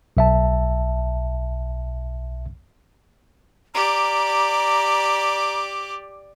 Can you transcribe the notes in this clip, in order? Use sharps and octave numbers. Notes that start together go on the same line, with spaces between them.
B1 E5 A5
G4 D5 A#5